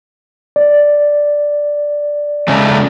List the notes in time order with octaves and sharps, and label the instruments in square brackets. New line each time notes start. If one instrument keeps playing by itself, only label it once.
[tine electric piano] D5
[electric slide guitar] C#3 G#3 A3